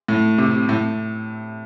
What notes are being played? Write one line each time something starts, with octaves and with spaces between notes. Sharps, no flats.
A2
C3
A2